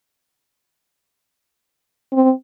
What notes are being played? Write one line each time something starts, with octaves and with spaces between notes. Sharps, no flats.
C4